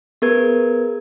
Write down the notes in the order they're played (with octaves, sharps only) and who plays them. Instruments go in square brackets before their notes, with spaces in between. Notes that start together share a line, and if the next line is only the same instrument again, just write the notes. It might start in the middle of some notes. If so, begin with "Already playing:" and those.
[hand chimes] B3 G#4 A#4 B4 G#6